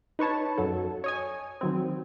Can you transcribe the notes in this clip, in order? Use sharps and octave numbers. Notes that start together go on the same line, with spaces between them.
D#4 B4 C#5 A5
F#2 F#3 A4
C#5 D#5 G#5
D#3 F#3 C4